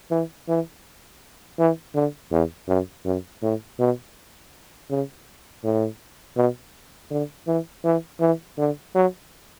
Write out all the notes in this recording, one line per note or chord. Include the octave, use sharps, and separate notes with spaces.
E3
E3
E3
D3
E2
F#2
F#2
A2
B2
C#3
A2
B2
D3
E3
E3
E3
D3
F#3